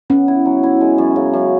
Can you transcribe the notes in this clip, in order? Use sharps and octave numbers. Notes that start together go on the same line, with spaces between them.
B3 C#4
E4
F#3
E4
G#3
F#2
C#3
F#2